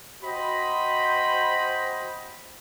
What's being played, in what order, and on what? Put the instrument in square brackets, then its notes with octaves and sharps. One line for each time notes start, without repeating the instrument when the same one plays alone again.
[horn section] F#4 C5 D#5 G5 B5